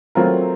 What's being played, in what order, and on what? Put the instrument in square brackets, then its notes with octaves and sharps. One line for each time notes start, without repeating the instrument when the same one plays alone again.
[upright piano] F#3 A3 C4 F4 A#4